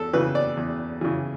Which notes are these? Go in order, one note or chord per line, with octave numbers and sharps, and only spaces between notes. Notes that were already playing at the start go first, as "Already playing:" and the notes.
Already playing: E2 A4
C#3 E3 B4
D5
E2
C#3 E3